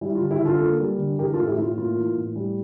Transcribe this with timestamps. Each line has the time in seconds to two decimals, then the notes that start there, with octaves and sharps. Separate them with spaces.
0.01 G3 E4
0.15 F4
0.21 D3
0.31 E4 G4
0.41 D3 F4 A4
0.60 A#3
0.80 G3
0.99 D3
1.18 E3 G4 A#4
1.33 F4 A4
1.38 A2
1.47 E4 G4
1.58 A2 F4
1.77 A#3 F4
1.97 E3
2.16 A2
2.36 G3